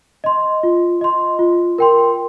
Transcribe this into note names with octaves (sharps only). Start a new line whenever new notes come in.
D#5 C6
F4
D#5 C6
F4
A#4 G5 C6